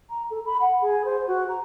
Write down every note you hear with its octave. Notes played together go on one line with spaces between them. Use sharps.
A#5
A4
B5
F#5
G#4
C5
F#4
A#5